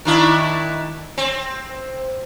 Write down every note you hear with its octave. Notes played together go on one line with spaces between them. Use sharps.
D#3 D4 E4
C4